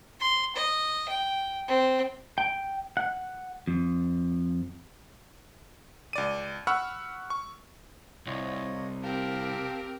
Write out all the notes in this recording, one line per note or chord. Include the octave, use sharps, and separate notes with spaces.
C6
D#5
G5
C4
G5
F#5
F2
C#2 D5 D#7
F#5 B5 C#6 E6 F6
C#6
C2 F4 C#5 D#5
C4 G4 A#4 F5 A5